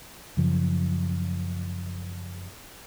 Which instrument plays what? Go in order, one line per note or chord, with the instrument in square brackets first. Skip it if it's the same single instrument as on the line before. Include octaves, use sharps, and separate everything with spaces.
[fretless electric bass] F#2 C#3 F3